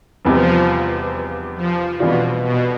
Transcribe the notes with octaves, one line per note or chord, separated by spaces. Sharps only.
F1 E2 C3 F3 G3
F3
F2 B2 E3 G3 D4 F4
B2